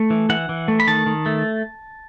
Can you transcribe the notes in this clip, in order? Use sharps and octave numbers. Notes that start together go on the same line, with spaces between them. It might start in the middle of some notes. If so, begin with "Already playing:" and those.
Already playing: A3
E3
E3 F#5
E3
A3
B5
D#3 A5
D#3
A3